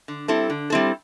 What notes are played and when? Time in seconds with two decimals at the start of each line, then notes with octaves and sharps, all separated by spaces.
0.08 D3
0.28 G3 C4 E4 A4
0.50 D3
0.70 G3 C4 E4 A4